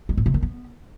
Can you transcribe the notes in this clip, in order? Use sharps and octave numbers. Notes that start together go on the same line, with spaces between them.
G#3
A2
C3
D#3
B3